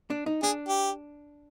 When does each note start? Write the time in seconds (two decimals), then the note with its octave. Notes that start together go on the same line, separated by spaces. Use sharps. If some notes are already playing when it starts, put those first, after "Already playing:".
0.10 D4
0.26 D#4
0.43 D4 G#4
0.68 G4